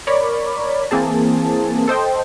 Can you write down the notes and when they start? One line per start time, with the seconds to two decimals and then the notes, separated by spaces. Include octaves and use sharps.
0.07 A#4 C#5 D5 B5
0.91 E3 A#3 C4 G#4 A5
1.88 A4 C5 D#5 G5